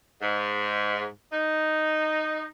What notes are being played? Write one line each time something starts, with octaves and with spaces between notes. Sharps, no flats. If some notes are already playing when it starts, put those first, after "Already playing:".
G#2
D#4